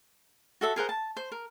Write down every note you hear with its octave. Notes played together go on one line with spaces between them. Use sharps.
F#4 A4 E5
G#4 A#4 C5 F#5
A5
C5
A#4